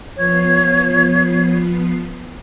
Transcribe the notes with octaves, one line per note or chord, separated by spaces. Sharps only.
F3 B3 C#5 C7